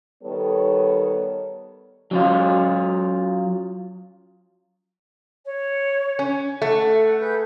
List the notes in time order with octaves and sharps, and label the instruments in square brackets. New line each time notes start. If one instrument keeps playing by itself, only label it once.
[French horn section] D#3 G3 B3 A4 C#5
[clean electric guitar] F#3 C#4 F4
[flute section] C#5
[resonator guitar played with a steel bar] C#4
[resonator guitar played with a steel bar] A3 [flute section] F#5
[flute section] G#4 B4 G6